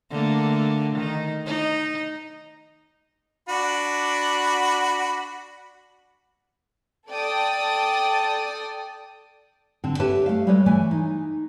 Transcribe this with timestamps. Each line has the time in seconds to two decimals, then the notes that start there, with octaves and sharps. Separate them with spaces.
0.11 D3 A3 A#3
0.96 D#3 D#4
1.46 D#4
3.49 D4 F#4 B5
7.10 A4 D5 G5 A5 D#6
9.84 D3 C4
9.99 G4 A4 B4 C#5 E5 A5
10.26 A3 F5
10.47 G3 G#3 A4 B4 C#5
10.66 E3 A3 B4 E5 G#5
10.91 D#4